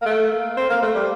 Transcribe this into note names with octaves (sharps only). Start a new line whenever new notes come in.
A#3
A3
A#3
C4
A#3
A3
G3